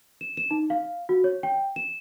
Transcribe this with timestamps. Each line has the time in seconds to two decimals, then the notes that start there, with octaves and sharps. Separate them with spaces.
0.21 E7
0.37 E7
0.51 D#4
0.70 F5
1.09 F#4
1.24 C#5
1.43 G5
1.76 E7